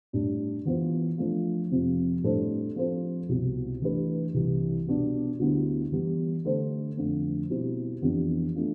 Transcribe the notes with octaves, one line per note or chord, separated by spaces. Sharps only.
A2 G3 D4
E3 B3 F4 C5
F3 A3 D4 F4
F2 C3 F3
A2 G3 D4 A4 C5
F3 C4 F4 A4 C5
C2 B2 G3
E3 A3 D4 G4 B4
C2 C3 E3 G3
B2 G3 B3 D4
D2 D3 G3 B3 E4
E3 G3 B3
D3 A3 D4 A4 C5
F2 D3 F3 A3
B2 G3 C4 E4 G4
F2 E3 B3 D4 G4
A3 D4 F4